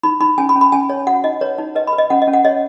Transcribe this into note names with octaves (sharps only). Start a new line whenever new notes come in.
D#4 B5
D#4 B5
C#4 G#5
B5
C#4
B5
C#4 G#5
C#5
F#4 F#5
D#4 D#5
B4 C#5
D#4
B4 D#5
B5
B4
D#5
C#4 F#5
D#5
C#4
F#5
C#5 D#5